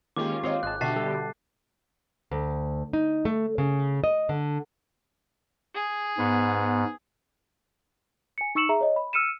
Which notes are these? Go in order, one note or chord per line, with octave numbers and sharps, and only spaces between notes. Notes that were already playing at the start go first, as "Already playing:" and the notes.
D#3 G#3 A#3 C#4 F4 G4 D6
C4 F4 C#5 D#5
G#1 F4 G#4 D#5 A5 F#6
B2 D3 F#4 G4 E5 A5 A6 C7
G3 A4
D2
D#4
A3
C#3
D#5
D3
G#4
G#2 B3
G#5 C#7
D#4 C#6 E6 C#7 E7 F#7
G#4 E5 A#5
C#5 D#5
B5
E6 F6 C#7 D#7 E7